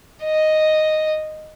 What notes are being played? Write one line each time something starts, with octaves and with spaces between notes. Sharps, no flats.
D#5